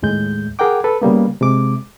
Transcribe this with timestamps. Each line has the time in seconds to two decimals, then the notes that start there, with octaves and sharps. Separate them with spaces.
0.02 D#2 A2 G#3 G6
0.59 G#4 A#4 F#5 G5 D6
0.84 A4 B4
1.02 C#3 G3 A#3 B3
1.41 C3 G#3 D6